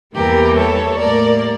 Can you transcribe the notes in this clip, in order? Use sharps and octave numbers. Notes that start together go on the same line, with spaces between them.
E2 E3 G3 A#3 G4 A#4
A4 C#5
A2 G3 A#3 A#4 D5